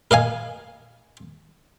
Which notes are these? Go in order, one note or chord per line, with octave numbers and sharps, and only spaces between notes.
A#4 D#5 F5 G#5